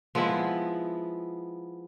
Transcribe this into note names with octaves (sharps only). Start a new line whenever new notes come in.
F3 G#3 B3 E4